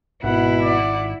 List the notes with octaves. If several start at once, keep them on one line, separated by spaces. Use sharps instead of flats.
G#1 B2 E4 F#5 B5
D5 F#5